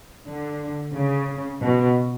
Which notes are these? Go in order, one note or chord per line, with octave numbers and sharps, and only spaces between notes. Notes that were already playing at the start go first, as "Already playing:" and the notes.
D3
C#3
B2